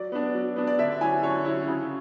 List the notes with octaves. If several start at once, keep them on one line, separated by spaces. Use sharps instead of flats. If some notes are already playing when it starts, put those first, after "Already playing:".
Already playing: F#3 D5
B3 D4
F#3
B3 D4
D5
D3 E5
F#3 C#4 E4 G#5
D3 C#5
F#3 C#4 E4
C#3